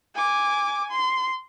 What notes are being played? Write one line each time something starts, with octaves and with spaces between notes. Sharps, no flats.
G#5 D6
C6